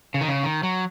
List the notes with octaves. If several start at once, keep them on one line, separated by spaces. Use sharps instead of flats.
C#3
D#3
C#3
D#3
F#3